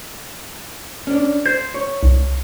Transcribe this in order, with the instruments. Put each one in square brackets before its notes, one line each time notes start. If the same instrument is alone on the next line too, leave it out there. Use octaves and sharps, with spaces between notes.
[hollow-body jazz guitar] C#4 D4
[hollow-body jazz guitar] C5 [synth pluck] G6
[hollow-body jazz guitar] C#5
[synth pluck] C2